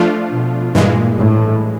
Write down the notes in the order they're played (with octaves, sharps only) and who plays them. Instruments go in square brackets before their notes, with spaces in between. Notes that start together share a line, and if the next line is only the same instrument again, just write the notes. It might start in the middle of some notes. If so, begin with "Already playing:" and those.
Already playing: [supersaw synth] F3 A3 D4 F4
[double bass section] B2
[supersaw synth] G2 E3 G#3 [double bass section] A#2
[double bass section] A2